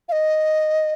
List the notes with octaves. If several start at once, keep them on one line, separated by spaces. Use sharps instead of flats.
F5
D#5